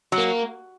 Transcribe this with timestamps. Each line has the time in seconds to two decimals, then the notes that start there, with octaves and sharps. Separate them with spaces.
0.12 F#3
0.18 A#3